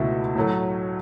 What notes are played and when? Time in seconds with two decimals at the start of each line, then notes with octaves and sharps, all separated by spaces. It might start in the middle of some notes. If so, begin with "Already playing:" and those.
Already playing: C#2 B2 A3 E4 F#4 A4
0.35 A2 F#3 A3